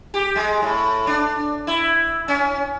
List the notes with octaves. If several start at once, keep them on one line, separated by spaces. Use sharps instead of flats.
G4
G#3
A2
D4
E4
C#4